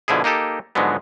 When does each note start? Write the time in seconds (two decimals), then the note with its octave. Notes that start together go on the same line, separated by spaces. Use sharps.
0.08 B2 D3 F3 E4 G#4
0.24 A#3 D#4 G4 A4
0.75 G#2 D3 F3 F#3 G#3 B3